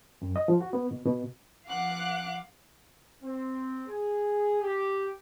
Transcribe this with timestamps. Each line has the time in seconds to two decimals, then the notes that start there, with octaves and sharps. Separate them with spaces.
0.22 F#2
0.36 D#5
0.48 F3
0.61 F#4
0.73 B3
0.91 B2
1.05 B2
1.67 F3 F5 F#5 D6 F#6
3.23 C4
3.88 G#4
4.62 G4